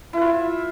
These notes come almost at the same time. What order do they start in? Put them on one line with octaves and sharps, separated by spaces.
E4 B4 F4 E5